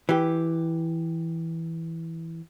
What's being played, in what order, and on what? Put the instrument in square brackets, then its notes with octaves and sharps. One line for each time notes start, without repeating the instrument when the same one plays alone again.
[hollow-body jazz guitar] E3 G4